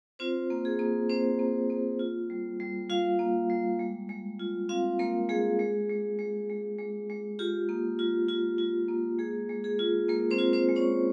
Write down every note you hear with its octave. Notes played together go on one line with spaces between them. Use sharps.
C4 F4 C5
A#3
G#4
A#3
A#3 C4 C5
A#3
A#3
F4
G3
G3
G3 F4 F5
A#3
G3
G#3
G#3
F4
C4 F4 F5
G#3 A#3 A#4
G#3 G#4
G#3
G#3
G#3
G#3
G#3
G#3
F4 G4
A#3
F4
F4
F4
A#3
G#3 G#4
G#3
G#4
F4
G#3 A#3 A#4
C4 C5
F4
C4 C5
G#3
C#4 C#5